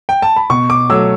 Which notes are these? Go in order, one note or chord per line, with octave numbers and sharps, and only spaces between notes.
G5
A5
B5
B2 C#6
D6
F#3 A3 E6